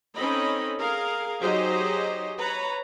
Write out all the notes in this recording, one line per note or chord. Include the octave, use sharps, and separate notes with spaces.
C4 C#4 D#4 A4 D#5 B5
G#4 A#4 F5
F#3 D#4 G4 G#4 C5 D#5
B4 C#5 A#5